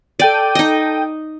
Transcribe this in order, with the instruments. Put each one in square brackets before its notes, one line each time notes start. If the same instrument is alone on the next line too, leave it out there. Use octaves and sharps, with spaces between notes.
[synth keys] A4 G5 D#7 [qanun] D5
[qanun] D#4 D#5